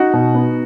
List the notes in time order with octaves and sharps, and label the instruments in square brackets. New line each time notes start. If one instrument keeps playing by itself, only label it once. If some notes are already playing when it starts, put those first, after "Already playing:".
Already playing: [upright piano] D#4 F#4
B2
B3